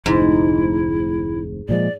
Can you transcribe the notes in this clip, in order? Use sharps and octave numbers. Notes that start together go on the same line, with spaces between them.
F1 D2 G#2 E4
A#2 F3 G#3 D5